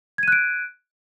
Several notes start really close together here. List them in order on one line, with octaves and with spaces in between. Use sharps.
G#6 D#7 F#6 D7